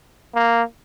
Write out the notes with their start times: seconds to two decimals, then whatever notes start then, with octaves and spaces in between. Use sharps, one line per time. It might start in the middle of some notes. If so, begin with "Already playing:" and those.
0.35 A#3